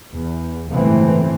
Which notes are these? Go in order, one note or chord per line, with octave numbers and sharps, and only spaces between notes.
E2
G1 C#2 A2 E3 A3 C4